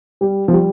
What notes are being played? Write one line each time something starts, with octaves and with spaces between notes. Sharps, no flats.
G3
F3
G3